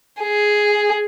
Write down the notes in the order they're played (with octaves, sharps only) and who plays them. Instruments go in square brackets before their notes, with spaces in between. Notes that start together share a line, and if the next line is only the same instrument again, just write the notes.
[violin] G#4